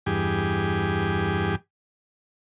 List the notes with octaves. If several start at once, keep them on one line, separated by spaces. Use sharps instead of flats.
E2 G2 G4 G#4